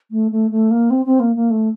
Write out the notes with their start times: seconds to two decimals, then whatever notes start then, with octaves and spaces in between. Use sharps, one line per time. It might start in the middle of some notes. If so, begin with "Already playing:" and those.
0.11 A3
0.32 A3
0.51 A3
0.71 A#3
0.90 C4
1.06 C4
1.20 A#3
1.36 A#3
1.50 A3